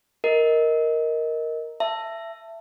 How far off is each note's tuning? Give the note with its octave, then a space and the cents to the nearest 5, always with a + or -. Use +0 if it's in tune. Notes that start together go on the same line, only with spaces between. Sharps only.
A#4 +0 D#5 +15
E5 +20 A5 +15